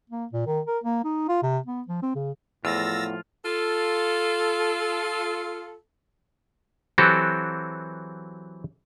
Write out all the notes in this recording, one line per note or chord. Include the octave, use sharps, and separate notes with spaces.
A#3
A#2
D#3
A#4
A#3
D#4
F4
C3
B3
F3
C4
C#3
E2 A2 F3 F4 E6 A6 A#6
F4 A4
E3 F#3 C4 F#4 G4 A4